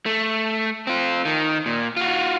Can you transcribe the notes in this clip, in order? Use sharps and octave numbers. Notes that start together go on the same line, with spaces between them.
A3
C4 F4
D#3
A#2
F4 F#4